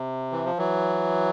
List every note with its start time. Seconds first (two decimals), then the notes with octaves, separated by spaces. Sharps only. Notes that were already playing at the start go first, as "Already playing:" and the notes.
Already playing: C3
0.32 E3
0.45 F3
0.58 E3 F#3